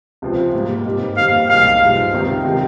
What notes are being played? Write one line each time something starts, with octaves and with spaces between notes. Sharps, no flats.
C#2 C3 F3 C4 F4
G#2 G3 A#3
G2 G3 C4 D#4 G4
F2 D#3 G3 A#3 F5
C2 A#2 G#3 D#4 G4 F5
G2 F3 G#3 D#4
C#2 C3 D#3
C3 D#3 G#3